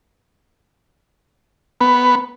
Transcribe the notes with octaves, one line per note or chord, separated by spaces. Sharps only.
B3